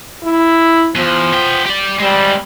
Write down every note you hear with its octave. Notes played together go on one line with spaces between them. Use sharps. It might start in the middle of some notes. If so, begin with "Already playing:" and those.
E4
E2 F3
B3 G5
G4 D5
G3 G#3 C4